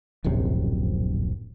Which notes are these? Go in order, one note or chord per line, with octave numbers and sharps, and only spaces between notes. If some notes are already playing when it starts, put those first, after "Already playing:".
D1 A#1 F#2 C3